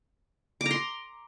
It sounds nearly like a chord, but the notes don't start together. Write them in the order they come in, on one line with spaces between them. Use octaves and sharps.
D6 A#5 C6